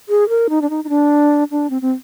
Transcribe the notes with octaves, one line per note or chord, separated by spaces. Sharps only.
G#4
A#4
D#4
D4
D#4
D#4
D4
D4
C4
C4